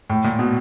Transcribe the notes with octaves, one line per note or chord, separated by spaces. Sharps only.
A2
A#2
B2